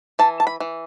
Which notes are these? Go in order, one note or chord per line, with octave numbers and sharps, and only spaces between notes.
E3 A5
A5
B5
E3